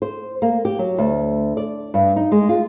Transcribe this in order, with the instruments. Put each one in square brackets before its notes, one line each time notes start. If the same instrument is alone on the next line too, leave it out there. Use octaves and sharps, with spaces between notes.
[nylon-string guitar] C5
A#3
G4
F#3
D2
D5
G2
D#4
G#3
F4